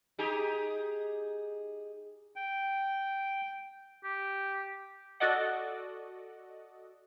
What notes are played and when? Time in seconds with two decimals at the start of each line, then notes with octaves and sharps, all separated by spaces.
0.19 D#4 G4 G#4
2.36 G5
4.04 G4
5.20 F#4 A4 D5 D#5 F#5